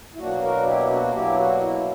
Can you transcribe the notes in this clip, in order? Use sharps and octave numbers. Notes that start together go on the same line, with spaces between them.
E4
B2 F#3 A#3 D4 F#4
F#4 A#4
E4 G4
D4 F#4
B2 F#3 A#3 D4 E4 G4
D4 F#4
E4